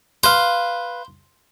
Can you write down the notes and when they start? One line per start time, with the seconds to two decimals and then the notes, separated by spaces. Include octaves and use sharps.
0.24 B4 C5 F5